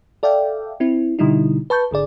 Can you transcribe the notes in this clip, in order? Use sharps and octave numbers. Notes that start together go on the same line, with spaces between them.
A4 D5 E5 F5 G5
C4 E4
B2 D3 G3 D#4 E4
B4 A5 C#6 G6
G#1 D3 G#4 D5